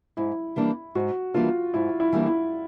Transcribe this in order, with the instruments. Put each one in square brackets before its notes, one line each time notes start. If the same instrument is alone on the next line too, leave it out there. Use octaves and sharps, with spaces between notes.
[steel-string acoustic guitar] G#2 [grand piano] E4
[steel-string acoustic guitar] E3 G3 A#3 D4
[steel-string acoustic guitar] G#2 [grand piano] F#4
[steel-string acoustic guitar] E3 G3 A#3 D4 [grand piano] F4
[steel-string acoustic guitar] G#2 [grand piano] E4
[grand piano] E4
[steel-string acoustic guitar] E3 G3 A#3 D4
[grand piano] E4